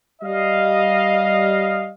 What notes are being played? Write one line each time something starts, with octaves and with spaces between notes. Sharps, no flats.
G3 D#5 F5